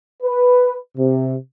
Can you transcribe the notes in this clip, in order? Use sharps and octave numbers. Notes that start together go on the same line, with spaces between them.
B4
C3